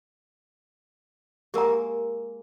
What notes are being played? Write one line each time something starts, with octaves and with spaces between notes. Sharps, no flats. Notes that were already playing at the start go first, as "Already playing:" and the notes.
G#3 A#3 G4 A#4 A#5